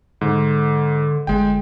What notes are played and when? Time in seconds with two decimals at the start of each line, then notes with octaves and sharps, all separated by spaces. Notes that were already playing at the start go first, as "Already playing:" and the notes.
0.21 G#2 D3
1.27 G1 G#3 G5